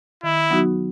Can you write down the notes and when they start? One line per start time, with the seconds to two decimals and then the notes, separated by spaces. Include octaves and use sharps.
0.23 D#3 E4
0.50 F#3 B3 D#4 F#4